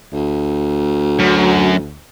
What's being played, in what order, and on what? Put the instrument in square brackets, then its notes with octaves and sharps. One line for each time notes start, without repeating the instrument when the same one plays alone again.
[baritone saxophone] D2
[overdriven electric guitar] F#2